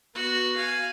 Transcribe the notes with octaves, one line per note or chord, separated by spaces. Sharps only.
B3 F#4
F5 G#5